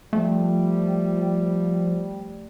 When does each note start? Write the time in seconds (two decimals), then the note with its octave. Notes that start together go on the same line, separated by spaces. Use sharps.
0.13 F3 G3 A3